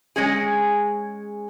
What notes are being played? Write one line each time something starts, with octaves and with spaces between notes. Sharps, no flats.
G#3 C#4 G#4